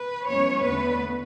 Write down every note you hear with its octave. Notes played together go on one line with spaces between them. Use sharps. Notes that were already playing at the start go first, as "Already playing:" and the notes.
Already playing: B4
F#2 E3 G#3 B3 C#4 C#5
E2 D3 A3 B3 B4